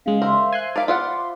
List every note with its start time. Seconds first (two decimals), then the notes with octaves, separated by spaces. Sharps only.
0.06 C#3 G#3 F5
0.22 A#4 C5 E5
0.53 G#5 C6 F#6
0.76 A#4 D5 F5 B5 D6
0.88 F4 F5 F#5 C6